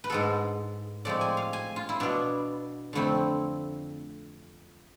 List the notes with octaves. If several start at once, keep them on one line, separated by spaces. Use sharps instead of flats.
B4
G#2 G#3 B3 A4
A2 F3 G#3 C4 D5
G#5
F5
G#5
F4
E4
B2 B3 D4
F2 D3 A3 C4 E4